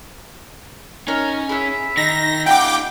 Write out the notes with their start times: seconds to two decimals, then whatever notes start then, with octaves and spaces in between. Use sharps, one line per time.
1.08 C#4 D#4 A#4
1.49 E4 G#4 E5
1.97 D#3 D#4 A#6
2.46 D#4 F4 F#5 G5 D6